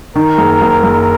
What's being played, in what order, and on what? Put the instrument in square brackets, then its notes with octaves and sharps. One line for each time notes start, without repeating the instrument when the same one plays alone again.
[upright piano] D#3 [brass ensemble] A#4
[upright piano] F#1
F#1
F#1